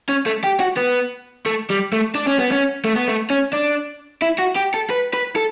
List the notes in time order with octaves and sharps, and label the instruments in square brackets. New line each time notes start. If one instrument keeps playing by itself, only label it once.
[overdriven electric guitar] C#4
A3
G4
F#4
B3
A3
G3
A3
D4
C#4
B3
C#4
A3
B3
A3
C#4
D4
E4
F#4
G4
A4
B4
B4
A4